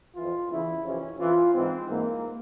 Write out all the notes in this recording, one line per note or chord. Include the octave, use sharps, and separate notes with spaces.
F2 E3 F4
E2 C#3 E3 E4
F2 C3 E3 C#4
F2 E3 F4
G#2 E3 C4
G#2 E3 A#3